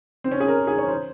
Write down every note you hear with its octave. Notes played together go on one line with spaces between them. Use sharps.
C4
C#4
G#4
A#4
G#4
C#5
C5